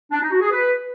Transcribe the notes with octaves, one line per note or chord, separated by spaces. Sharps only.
D4
D#4
F#4
G#4
B4